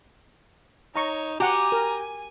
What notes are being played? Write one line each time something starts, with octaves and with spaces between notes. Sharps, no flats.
D#4 C#5 A#5 C#6
F#4 G4 F#5 G#5 A#5
A#4